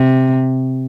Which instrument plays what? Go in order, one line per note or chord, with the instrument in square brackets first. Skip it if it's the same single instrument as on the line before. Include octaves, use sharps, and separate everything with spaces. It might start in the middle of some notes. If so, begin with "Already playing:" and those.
Already playing: [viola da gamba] C3